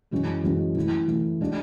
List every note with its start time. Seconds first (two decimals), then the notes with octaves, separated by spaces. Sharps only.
0.11 F#2 E3 G#3 C#4 F#4
0.44 F#2 E3 G#3 C#4 F#4
0.75 E3 A3 E4
1.08 E3 A3 E4
1.41 G#3 D4 F#4